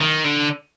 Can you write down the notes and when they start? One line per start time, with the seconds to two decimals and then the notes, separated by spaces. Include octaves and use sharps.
0.01 D#3
0.24 D3